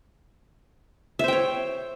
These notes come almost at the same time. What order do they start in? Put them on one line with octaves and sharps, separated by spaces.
E5 C5 G5 C#5